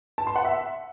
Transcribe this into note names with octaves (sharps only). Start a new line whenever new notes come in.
A5
C6
F#5
E5